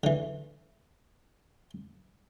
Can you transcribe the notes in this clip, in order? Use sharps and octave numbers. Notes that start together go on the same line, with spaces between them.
D3 E3